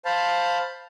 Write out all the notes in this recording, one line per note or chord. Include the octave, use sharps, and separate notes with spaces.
C5 F5 A5 B5